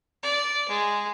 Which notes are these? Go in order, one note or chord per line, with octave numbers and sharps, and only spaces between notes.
D5
G#3